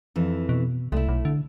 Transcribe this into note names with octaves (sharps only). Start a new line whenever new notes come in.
F2 E3
B2
C2 A3 E4
B1
D3